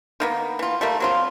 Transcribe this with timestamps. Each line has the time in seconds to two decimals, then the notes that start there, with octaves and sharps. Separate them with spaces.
0.20 D#3 A#3 B3
0.59 E3 F4
0.81 G3 A3 A#3
1.00 F#3 C4 F4